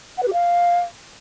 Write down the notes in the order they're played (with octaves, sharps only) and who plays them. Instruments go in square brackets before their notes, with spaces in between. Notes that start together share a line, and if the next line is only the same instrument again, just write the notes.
[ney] F#5
B4
G4
F5